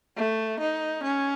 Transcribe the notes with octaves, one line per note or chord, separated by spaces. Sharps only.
A3
D#4
C#4